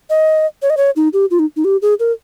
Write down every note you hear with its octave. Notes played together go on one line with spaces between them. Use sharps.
D#5
C#5
D#5
C#5
D#4
G4
F4
D#4
D#4
G4
G#4
A#4